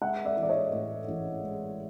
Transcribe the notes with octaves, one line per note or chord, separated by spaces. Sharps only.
G#3 E5 F#5
D5 E5
E3
D5
C#5 D#5
A2
A1
G#3